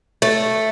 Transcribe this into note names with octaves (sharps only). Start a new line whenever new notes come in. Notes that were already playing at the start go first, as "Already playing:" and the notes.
A3